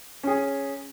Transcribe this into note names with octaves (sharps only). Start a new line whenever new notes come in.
C#4 G#4